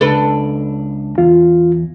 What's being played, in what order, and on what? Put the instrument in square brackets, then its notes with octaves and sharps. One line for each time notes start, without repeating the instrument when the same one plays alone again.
[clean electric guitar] C#2 D4 [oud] A4 B4
[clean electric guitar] E2 [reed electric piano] F4